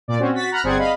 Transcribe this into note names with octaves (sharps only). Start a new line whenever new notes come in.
A#2 D5
C4 C#4 F#4
F#4 A6 B6
F#5 A#5 B5 F6 F#6
G1 C4 G#4 D5 F#5 G#6
D#5 F5 B5